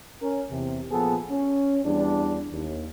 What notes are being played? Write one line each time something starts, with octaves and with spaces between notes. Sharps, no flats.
C#4 A#4
E2 C3
A#2 F3 B3 G#4 A4
C#4
E2 G3 D4
D#2